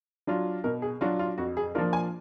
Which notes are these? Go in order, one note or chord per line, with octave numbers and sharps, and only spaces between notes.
F#3 D4 F4
B2 A#4
G#4
F#3 D4 F4 F#4
F4
F2 F#4
G#4
F3 A#3 D4 F4 A#4
G#5